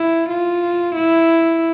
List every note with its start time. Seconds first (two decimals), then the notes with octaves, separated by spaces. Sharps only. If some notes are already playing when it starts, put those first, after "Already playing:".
Already playing: E4
0.30 F4
0.96 E4